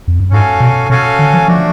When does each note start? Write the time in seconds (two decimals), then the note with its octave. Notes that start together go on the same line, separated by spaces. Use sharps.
0.08 F2
0.20 F#2
0.31 G#2 C#4 F#4 A4 F5 G#5
0.60 B2
0.89 B2 C#4 F#4 A4 F5 G#5
1.19 D3
1.33 F3
1.48 F3 A3 D4 F#4